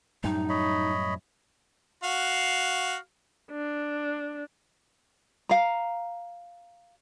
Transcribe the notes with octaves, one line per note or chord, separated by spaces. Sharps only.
F#2 A2 G3 D#4
C#5 D#5 B5
F#4 F5
D4
F5 A#5